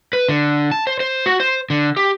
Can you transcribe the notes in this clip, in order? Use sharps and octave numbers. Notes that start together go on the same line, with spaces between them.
B4
D3
A5
C5
C5
F#4
C5
D3
G4